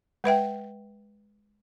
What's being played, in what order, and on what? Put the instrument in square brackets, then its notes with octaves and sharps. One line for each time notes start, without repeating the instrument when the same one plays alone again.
[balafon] G#3 B4 E5 G5